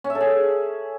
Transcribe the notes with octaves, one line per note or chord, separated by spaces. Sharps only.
C#4
E5
A4
G#4